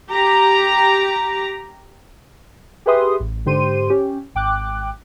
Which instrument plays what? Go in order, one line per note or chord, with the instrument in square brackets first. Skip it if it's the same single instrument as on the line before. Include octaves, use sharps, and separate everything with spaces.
[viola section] G4 A#5
[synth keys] G4 G#4 B4 E5 C6 D#6
A1
G#2 D3 G4 C5 C6 D#7
C#4 G4
G#1 G5 D6 F#6